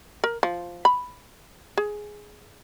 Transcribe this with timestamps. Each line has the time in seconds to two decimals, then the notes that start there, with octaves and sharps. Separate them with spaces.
0.24 A#4
0.43 F3
0.85 B5
1.77 G#4